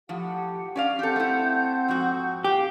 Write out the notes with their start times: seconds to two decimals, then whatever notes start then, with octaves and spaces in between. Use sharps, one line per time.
0.09 A2 F3 G4 F#5
0.76 C#4 D5 F5
0.99 C4 G4 A4 F#5 G6
1.16 A3 E4
1.88 F2 G#2 F#4
2.44 G4 F5